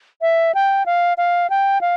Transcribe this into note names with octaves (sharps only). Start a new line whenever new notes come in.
E5
G5
F5
F5
G5
F5